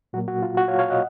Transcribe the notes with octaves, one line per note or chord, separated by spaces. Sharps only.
A#2 F#3 A#3 F#4
F#4
F4
F#4
C#5 F5
C#5 F5
D#5 F#5